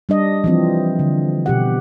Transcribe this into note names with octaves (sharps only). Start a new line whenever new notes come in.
G3 D4 D#5
E3 F3 C4
D3
B2 G4 F#5